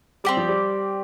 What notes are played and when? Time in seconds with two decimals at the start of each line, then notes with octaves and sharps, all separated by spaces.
0.24 G3 C4 G4 D5
0.37 F3
0.49 G3